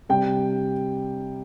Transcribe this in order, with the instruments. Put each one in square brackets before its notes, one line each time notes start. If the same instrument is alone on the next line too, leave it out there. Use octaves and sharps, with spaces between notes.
[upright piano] C3 G3 C4 G5